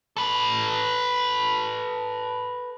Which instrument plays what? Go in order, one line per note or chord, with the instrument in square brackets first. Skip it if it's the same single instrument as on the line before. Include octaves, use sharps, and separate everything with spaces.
[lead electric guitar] A4 B4